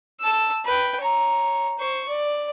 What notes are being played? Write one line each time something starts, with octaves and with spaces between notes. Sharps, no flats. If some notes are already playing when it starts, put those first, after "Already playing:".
A5 E6
B4 G5
C#5 A#5
C5 C#6
D5